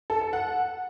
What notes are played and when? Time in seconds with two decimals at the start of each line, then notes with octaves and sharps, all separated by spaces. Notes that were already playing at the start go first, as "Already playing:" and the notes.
0.10 A4
0.21 A4
0.33 F#5